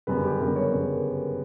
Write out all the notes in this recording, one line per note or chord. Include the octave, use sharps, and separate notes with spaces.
G1 F#2 C#3 G3 B3 B4
G4
G1 F#2 C#3 G3 B3 A#4
C#5
G1 F#2 C#3 G3 B3